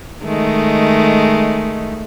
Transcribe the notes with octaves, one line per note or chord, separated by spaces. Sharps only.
D#3 G#3 A3